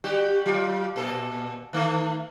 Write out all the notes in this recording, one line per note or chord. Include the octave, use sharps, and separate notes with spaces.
G3 F#4 G4
F#3 F4
A#2 A4
D#3 A3